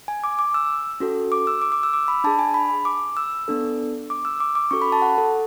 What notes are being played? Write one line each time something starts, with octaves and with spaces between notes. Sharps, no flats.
G#5
D6
D6
E6
C#4 F#4 A4
D6
E6
D6
D6
E6
D6
B5
D4 G#4 A5
G#5
B5
D6
E6
B3 D4 A4
D6
E6
D6
D6
C#4 F#4 A4 C#6
B5
A5
F#5
A4